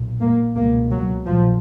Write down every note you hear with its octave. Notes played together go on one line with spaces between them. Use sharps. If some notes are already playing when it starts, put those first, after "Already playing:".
Already playing: B1 A#2
A#3
C#2 B2 A#3
F#3
A#1 A#2 F3